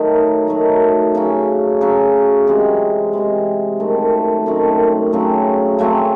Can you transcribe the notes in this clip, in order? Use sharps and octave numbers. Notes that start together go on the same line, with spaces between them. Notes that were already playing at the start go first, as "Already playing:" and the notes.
Already playing: D#3 F#3 A3
D#3 F#3 A3
C#3 F#3 C#4
C#3 F#3 C#4
C3 E3 G#3
C3 E3 G#3
F#2 D#3 A3 C4
F#2 D#3 A3 C4
C#3 F#3 A3 C4
C#3 F#3 A3 C4